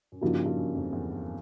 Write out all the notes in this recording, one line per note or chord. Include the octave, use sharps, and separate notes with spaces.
F#2
G2 C#3 F3 A#3 D#4 F#4
G2
F#2
F2
E2